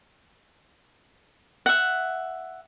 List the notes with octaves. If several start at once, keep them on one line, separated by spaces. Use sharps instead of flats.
E5 F#5